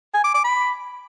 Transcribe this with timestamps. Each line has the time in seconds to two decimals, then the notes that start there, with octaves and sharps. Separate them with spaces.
0.14 G#5
0.24 D6
0.34 D6
0.44 B5